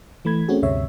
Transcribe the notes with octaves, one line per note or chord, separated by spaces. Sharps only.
E3 A3 B5 G#6
A3 C4 C#4 F#4 G#4
D2 G2 C3 C#5 E5